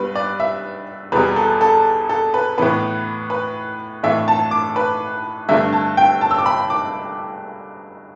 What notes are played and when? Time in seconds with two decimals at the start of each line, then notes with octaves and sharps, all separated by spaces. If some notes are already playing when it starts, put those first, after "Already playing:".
Already playing: G2 G3 B3 B4
0.15 D5
0.40 E5
1.12 E2 B2 G3 B4
1.36 A4
1.61 A4
2.09 A4
2.34 B4
2.58 A2 E3 B3 B4
3.30 B4
4.03 A2 E3 A3 D4 E5
4.28 A5
4.51 D6
4.76 B4
5.49 G2 D3 A3 D4 E5
5.73 A5
5.97 G5
6.21 A5
6.31 E6
6.38 D6
6.46 B5
6.70 D6